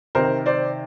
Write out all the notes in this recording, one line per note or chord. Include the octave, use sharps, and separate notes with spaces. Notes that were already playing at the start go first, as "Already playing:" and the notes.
C3 D#3 A#4 C5
C5 D5